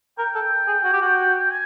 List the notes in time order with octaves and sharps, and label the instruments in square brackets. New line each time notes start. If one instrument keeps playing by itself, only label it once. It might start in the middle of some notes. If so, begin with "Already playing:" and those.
[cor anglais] A#4 [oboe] G5
[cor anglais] A4
G#4
F#4
G4
F#4
[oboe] G#5